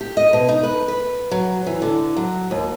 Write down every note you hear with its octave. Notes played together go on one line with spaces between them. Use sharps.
G4
D#5
B2
D#4
B4
B4
F#3
E3
D3
F#3
D#2